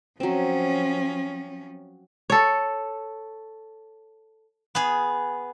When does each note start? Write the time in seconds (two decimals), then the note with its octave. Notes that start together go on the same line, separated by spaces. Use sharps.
0.20 F3 F#3 C4 C#4
2.30 A4 C#5
4.75 B3 G#4